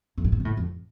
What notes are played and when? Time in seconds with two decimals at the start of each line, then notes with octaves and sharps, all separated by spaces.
0.18 F2
0.24 G2
0.32 A2
0.40 C3
0.45 A2
0.57 F2